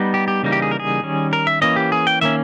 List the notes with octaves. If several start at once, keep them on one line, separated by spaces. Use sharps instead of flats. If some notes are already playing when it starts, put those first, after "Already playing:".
Already playing: G3 B3 D#4
G4
G4
C#3 E3 G3 A#3 D#4
G4
G#4
A#4
G#4
D#3 G3 C#4
A#4
E5
E3 A#3 C#4 D#5
G4
G#4
G5
D#3 A#3 C#4 E5